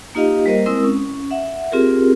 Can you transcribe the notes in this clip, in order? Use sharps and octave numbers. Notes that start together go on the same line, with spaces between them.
A#3 D#4 F4 G4 D#5 F5
G3 A#3 A#4 C5 D#5
G#3 C4 E4 A#4 D#6 E6
C#4
E5 F#5
C4 F4 G4 G#4 A#4